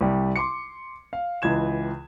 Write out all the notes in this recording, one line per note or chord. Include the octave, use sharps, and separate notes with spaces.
C2 G3
C6 D6 C#7
F5
C#2 E3 G#6 E7